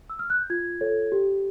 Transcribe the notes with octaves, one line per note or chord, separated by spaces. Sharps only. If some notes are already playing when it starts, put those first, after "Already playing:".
E6
F6
F#6
G6
F4 G#6
A4 C#5
G4